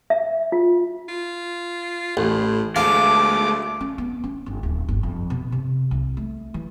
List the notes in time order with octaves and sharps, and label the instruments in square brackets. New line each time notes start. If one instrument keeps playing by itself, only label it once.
[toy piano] E5
F4
[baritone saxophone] F4
[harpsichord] A1 [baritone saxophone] A2
[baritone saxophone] D2 [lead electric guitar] G#3 A3 [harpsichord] F5 [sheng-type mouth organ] D6
[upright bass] C#4
B3
C#4
G1
D1
G1
F2
B2
C3
C2
A3
E3